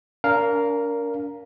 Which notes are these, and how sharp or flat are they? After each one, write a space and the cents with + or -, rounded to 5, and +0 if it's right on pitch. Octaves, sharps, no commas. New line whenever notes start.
D4 -45 A#4 +0 F5 +0